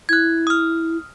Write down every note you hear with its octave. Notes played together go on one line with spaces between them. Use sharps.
E4 F#6 G#6
D#6 F6